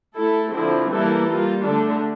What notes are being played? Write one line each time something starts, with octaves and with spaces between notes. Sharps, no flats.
A3 E4 A4
D3 F3 C4 E4
E3 G3 A#3 E4 A4
G3 A#3 F4
D3 A3 D4 A4